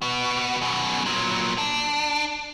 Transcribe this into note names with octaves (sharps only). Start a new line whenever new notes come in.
B3 F#4
F#2 B2
A#2 F#3
D4